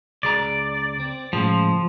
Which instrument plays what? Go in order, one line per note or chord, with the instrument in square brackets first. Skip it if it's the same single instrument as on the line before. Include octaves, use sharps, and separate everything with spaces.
[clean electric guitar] C#2 G#4 A#5 [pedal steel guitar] D5
[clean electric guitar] C4
[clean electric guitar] A2 C#3 G#3 [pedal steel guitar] F3